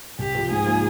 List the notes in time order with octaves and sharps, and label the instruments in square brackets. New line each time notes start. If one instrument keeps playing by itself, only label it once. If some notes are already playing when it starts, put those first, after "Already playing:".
[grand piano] C2 [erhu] G4
[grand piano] C3 F3
[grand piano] G#2 [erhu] G#4
[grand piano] F3 A#3 D#4